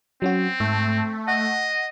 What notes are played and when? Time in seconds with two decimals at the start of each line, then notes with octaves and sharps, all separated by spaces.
0.22 F#3 C4 C#4 F#4
0.60 G#2 A3
1.28 D#5 F#5